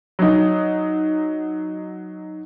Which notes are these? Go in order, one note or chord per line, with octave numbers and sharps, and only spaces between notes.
F#3 D#4